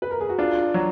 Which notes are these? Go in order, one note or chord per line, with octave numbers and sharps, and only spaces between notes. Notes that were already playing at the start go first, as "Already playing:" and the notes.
B4
A#4
G#4
F#4
D4 F4
F#3